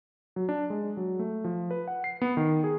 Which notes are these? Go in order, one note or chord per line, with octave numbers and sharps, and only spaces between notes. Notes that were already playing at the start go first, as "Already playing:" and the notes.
F#3
D4
G#3
F#3
A3
F3
B4
F#5
C7
B3
D#3
G#4